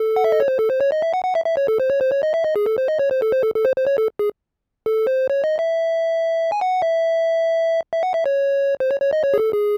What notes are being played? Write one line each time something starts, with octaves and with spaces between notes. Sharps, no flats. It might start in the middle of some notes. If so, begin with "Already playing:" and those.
Already playing: A4
F#5
E5
D#5
C#5
C5
A4
C5
C#5
D#5
E5
F#5
F#5
E5
E5
C#5
A4
C5
C#5
C5
C#5
D#5
E5
D#5
G#4
A4
C5
D#5
C#5
C5
A4
C5
A4
A4
C5
C5
C#5
A4
G#4
A4
C5
C#5
D#5
E5
G#5
F#5
E5
E5
F#5
E5
C#5
C5
C#5
C#5
D#5
C#5
G#4
A4
G#4